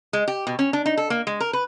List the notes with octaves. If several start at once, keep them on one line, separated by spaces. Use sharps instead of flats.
G#3
G4
B2
C#4
D4
D#4
A4
A#3
G#3
A#4
B4